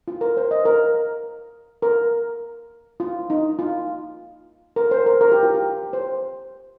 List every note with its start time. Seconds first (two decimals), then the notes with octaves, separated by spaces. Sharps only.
0.08 F4
0.21 A#4
0.37 C5
0.51 D#5
0.65 A#4
1.82 A#4
3.00 F4
3.30 D#4
3.59 F4
4.76 A#4
4.91 C5
5.06 A#4
5.21 A#4
5.32 G4
5.43 F4
5.54 G4
5.93 C5